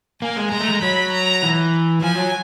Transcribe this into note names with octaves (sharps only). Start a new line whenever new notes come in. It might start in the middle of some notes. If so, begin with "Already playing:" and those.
A#3 G#5
G#3
G#3 A#5
A3
G#3
F#3 B5
A#5
E3
F3 G#5
F#3